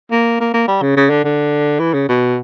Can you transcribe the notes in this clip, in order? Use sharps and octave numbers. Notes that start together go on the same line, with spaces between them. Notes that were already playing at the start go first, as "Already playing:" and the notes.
A#3
A#3
A#3
G3
C#3
C#3
D3
D3
E3
C#3
B2